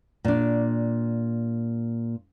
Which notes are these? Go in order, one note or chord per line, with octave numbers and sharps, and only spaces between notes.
A#2 D4